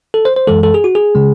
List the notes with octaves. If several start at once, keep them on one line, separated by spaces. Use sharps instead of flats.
A4
C5
C5
F#2 E3 G#3 A4
A4
G#4
F#4
G#4
C#3 G#3